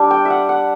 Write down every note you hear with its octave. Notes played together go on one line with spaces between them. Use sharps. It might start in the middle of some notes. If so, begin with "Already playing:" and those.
Already playing: G3 D4
G5
E5 F#5
F#5